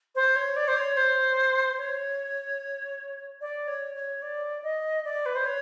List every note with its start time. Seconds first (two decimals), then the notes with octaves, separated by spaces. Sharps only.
0.15 C5
0.36 C#5
0.56 D5
0.68 C5
0.76 C#5
0.97 C5
1.78 C#5
3.41 D5
3.68 C#5
3.95 C#5
4.22 D5
4.63 D#5
5.05 D5
5.26 B4
5.35 C5
5.45 C#5